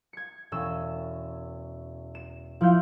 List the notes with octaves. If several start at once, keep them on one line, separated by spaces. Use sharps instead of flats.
G#6 C#7
E1 C#4 E6 E7
E7
F3 E4 F6 G6